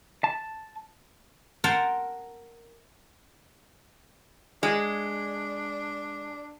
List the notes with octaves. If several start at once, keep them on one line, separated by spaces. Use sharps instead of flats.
A5
A#4 F#5 G5 A5 A#5 C6
G#3 D4